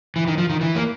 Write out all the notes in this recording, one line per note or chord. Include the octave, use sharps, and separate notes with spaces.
E3
D#3
F3
D#3
E3
A#3